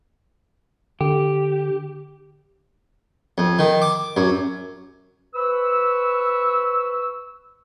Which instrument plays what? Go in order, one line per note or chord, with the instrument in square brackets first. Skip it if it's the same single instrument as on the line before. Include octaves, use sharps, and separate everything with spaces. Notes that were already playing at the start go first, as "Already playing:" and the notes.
[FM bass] D3 [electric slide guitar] G4
[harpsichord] F2
D#3
D6
F#2
[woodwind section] B4 C5 B5 C#6 E6